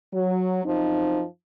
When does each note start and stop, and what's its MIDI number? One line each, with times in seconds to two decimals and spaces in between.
0.13 0.62 54
0.64 1.23 42
0.64 1.23 53
0.64 1.23 60
0.64 1.23 63